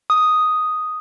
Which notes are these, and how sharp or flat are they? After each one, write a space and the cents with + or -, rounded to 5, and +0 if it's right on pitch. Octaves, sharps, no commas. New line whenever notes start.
D#6 +0